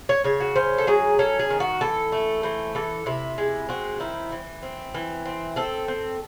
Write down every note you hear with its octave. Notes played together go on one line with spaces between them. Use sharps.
C#5
C#3 C#5
F#4
C#4 C5
A4
F#3 G#4
C#4 A4
G#4
D#3
F#4
E3 A4
A3
E3 C5
E3 A4
C3 E4
G#3
C4 F#4
D#3 E4
E3
C4
E3
C4
C4 A4
C4